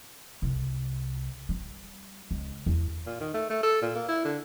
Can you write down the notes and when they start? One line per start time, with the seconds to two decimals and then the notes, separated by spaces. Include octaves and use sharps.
0.42 C2
1.49 G3
2.31 C#2
2.66 E2
3.06 A#2
3.20 D#3
3.34 A3
3.50 A3
3.63 A4
3.82 A#2
3.95 A#3
4.08 E4
4.25 D3